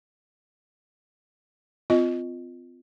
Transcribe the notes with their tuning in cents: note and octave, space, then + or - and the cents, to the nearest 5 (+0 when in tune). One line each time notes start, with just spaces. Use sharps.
C4 -35 F4 +0 D#5 +0